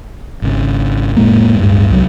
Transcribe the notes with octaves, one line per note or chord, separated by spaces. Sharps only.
G#1 C#3
F1 A2 G#3 A#3
D1 G2 G#3
C2 F#3